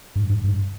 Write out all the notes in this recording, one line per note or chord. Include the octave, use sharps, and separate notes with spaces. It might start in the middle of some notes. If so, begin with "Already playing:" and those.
G2
G2
G2